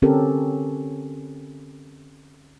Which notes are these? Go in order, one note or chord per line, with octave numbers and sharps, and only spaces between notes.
D3 C4 C#4 G4 A4 A#4